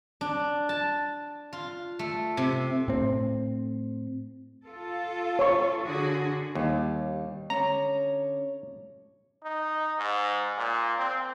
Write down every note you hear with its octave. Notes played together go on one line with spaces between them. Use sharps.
D4
A5
F4
A3
C3
A2 C4
F4 A4
C#5 C#6
D3 F#4 G#4
D#2 G3
D3 C#4 C#5 A#5
D#4
G#2
A#2
C4